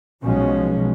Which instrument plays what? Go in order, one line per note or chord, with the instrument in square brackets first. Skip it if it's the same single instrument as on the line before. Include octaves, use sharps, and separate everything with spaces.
[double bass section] B1 B2 F3 G#3 C#4